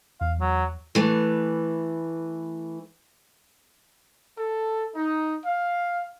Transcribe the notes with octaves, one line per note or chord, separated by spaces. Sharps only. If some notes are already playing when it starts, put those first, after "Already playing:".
E2 F5
F#3
E3 A3 B4
A4
D#4
F5